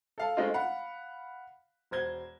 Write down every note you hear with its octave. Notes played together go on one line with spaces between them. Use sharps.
A4 F5 A5
G#3 A3 C4 C#4 D#4 F4
F5 F#5 B5
E1 C5 G#6 G7